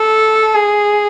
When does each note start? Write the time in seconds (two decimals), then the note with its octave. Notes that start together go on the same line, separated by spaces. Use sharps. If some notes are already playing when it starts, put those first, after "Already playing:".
Already playing: A4
0.55 G#4